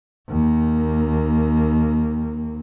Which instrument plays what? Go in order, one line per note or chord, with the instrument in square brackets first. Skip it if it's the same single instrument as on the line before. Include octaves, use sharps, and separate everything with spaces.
[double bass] D#2 A#3